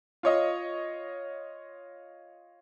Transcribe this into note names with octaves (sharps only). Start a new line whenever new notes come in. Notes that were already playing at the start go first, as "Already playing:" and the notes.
F4 C#5 D#5